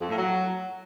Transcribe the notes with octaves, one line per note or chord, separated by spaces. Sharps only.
F2
A2
F#3